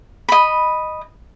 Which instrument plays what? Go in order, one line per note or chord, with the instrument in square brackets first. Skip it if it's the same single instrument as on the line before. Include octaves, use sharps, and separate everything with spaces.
[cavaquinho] D#5 B5